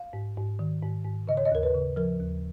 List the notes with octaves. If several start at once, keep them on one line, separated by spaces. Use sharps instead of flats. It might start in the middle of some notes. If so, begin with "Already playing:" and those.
Already playing: F5
G#2
G#2
D#3
G#2
G#2
C#3 D#5
C#5
D#5
D#2 A#4
B4
C#3
F3 A#4
D#2